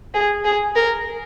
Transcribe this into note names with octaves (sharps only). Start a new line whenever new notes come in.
G#4
G#4
A#4